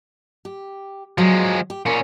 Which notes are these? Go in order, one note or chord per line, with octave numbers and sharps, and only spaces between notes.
G4
F3 F#3 G#3
G4
A#2 C#4 A#4